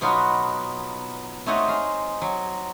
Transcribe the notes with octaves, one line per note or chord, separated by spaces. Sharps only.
B2 F#3 B3 D#4 F4 F#4
A3 C4 D#4 C#5 D#5 F#5
G#3 F5
F#3